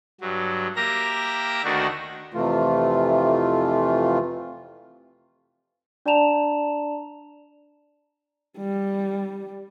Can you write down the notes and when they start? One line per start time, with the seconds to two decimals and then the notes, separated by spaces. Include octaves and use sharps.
0.21 G2 F#3
0.76 A#3 G4 A#4 E5 A#5 A#6
1.64 D2 D#3 A3 D4 F#4
2.34 F2 C3 E3 A3 F4
6.06 D4 D5 A5 A#5 E7 F7
8.58 G3